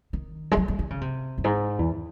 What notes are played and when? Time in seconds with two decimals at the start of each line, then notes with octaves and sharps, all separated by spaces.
0.13 D#3
0.51 G#3
0.57 F#3
0.68 F#3
0.79 D#3
0.90 C#3
1.01 C3
1.38 F#2
1.44 G#2
1.79 E2